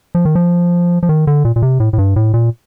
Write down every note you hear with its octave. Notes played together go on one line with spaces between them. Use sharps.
F3
D#3
F3
F3
D#3
D3
A#2
A#2
C3
A2
A2
G2
A2
A#2